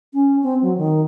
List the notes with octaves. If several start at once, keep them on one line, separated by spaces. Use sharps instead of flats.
C#4
C4
F#3
D#3